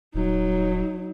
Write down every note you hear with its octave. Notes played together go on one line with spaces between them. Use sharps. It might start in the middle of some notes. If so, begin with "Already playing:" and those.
D#1 F#3 D#4